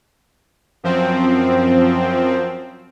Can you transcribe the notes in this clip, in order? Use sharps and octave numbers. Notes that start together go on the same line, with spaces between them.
F#2 F3 C4